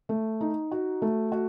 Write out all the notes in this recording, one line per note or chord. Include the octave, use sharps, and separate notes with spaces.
A3
D#4
F#4
A3
F#4